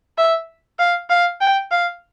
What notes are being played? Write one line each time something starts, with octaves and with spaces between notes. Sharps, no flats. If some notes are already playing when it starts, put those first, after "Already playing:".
E5
F5
F5
G5
F5